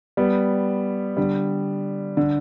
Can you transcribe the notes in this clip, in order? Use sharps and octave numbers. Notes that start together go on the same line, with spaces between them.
G3 B3
D3 G3
D3